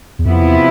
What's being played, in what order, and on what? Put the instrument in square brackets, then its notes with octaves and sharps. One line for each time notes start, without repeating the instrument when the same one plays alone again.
[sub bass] E2
[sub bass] F2 [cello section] C3 F3 B3 E4
[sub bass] E2